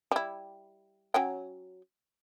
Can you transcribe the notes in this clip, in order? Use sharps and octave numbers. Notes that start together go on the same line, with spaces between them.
G3 E4
F#3 C#4 G5